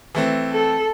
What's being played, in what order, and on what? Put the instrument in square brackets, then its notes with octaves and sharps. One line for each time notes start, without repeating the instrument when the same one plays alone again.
[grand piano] E3 A3 C4
[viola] A4